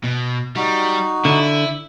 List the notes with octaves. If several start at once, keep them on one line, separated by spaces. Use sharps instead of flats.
B2
G3 D#4 F#4
D3 E4